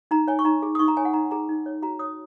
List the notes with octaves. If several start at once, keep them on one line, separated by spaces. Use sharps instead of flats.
D#4 A#5
C#5 G#5
C#6
D#4 A#5
G#4
D#6
D#4 C#6
A#5
C#5 G#5
F#5
D#4 A#5
G#4 A#5
D#4
C#5
F#4 A#5
C#5 D#6